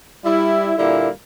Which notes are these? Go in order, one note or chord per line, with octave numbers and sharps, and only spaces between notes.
G3 E4
A#2 D3 G3 A#3 E4